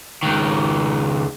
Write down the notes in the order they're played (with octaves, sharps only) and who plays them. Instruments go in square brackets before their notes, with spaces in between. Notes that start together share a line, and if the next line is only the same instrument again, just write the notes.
[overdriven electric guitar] C#2 D#3